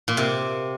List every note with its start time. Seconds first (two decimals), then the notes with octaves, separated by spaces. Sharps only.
0.08 A#2
0.17 C3